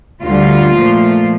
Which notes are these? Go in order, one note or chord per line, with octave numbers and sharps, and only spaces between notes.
D2 D3 G3 F4
A#2 F3 A3